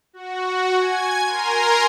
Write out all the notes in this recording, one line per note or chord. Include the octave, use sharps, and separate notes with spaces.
F#4
G#5 G#6
A#4 G#5 A#5 C6